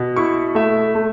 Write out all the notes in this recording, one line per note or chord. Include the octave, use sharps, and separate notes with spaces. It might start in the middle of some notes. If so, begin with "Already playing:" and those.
Already playing: B2
E4 C#6
A3 E5
A3